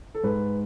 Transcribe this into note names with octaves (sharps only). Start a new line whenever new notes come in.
A4
G#2 B4